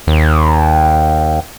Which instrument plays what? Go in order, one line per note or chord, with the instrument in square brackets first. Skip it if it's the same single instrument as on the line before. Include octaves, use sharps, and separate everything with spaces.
[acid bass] D#2